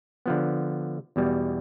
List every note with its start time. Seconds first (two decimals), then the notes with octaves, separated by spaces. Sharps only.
0.26 D3 F3 B3
1.16 E2 B2 G3